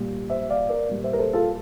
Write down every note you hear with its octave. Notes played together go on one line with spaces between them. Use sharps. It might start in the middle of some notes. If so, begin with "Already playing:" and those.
Already playing: A#2 G3
C5 E5
D5 F5
A#4 D5
A#2 G3
C5 E5
A#4
A4 C5
F4 A4